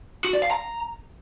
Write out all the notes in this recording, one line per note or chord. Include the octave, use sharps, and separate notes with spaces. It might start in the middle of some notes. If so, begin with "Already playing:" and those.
F#4
D5
F5
A#5